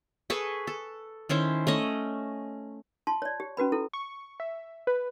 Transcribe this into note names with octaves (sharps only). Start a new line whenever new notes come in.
G#4 A4 B4 C#6
A4
D#3 C#4 E4 C5
A3 C#4 D#5
F4 A5 C6
C#5 D5
G4
C#4 F#4 B4 B5
E4 A4
C#6
E5
B4